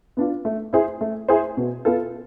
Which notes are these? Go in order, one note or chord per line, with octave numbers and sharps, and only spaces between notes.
B3 D4 F4
A3
E4 G#4 C5
A3
E4 G#4 C5
B2
B3 F4 A4